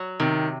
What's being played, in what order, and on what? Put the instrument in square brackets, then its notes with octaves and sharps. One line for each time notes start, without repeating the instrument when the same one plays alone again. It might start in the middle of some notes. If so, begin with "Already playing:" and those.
Already playing: [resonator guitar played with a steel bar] F#3
[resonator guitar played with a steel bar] C3 [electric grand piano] D#3